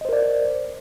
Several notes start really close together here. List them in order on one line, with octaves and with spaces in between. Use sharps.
D#5 C5 A#4 D5